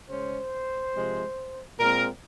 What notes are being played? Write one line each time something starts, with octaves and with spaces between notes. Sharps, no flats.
C#3 G#3 C#4 C5
C3 F3 G#3
A#2 G#3 C4 A#4